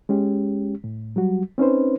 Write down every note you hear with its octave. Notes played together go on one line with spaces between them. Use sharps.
G#3 C#4 G4
A2
F#3 G3 F#4
C4 C#4 D#4 B4 C5